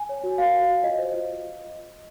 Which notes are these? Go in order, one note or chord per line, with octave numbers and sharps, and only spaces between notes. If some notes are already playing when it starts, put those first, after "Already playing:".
Already playing: G#5
C#5
F#4
A#4 F5
F#4
C#5
F4 D#5
C5
F4